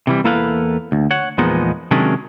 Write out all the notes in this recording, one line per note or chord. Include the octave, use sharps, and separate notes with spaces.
C3 E3 G3
E2 A#3 E4 A4 B4 F5
D2
C#5 F#5
E2 A#2 F3 G#3 B3 D#4
C3 D#3 F#3 G#3 C#4 D4